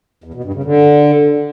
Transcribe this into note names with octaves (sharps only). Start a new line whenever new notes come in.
E2
B2
G2
C#3
D3